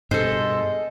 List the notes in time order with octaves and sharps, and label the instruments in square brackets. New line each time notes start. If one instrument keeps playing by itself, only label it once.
[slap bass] G2 B2 [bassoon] G#3 [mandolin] A4 C5